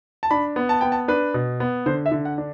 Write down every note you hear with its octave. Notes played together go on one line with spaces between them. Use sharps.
A5
D4 B5
B3
A5
B3 G5
A5
D4 B4
B2
B3
D3 C5
E5
D3
F#5
D4